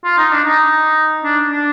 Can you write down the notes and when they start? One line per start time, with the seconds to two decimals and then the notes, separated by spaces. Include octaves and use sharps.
0.04 F4
0.17 D#4
0.32 D4
0.44 D#4
1.23 D4
1.50 D4